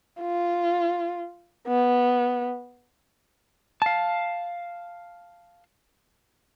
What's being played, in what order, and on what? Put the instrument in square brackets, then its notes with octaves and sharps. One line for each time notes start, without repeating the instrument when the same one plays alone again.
[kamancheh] F4
B3
[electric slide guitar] F5 A5